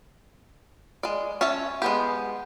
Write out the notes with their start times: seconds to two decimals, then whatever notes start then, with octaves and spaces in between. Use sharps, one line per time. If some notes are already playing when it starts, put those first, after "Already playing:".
1.03 G#3 D5
1.41 C#4 C#5 E5 A5
1.82 G#3 B3 G4